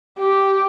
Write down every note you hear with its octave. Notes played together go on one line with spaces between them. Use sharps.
G4